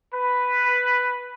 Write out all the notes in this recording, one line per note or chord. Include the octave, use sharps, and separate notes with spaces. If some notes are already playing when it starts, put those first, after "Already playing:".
B4